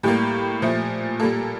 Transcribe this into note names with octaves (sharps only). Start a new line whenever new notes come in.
A2 G3 A#3 G4
A#2 F3 A3
A#2 G3 A#3 A4